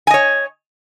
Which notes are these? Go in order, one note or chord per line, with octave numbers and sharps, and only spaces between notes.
C#5 D#5 G#5